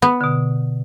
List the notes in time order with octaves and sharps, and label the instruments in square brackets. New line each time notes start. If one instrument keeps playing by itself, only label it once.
[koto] B3
[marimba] B2 D3